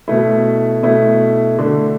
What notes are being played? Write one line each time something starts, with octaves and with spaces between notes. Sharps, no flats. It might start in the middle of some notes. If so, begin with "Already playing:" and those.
B2 A3 E4
B2 A3 E4
D3 A3 D4